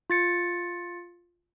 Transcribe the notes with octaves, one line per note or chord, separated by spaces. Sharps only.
F4 A6 C#7